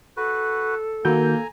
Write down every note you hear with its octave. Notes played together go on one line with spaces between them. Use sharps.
F#4 A4 B4
D#3 A#3 F#4 G#5 A#5 G6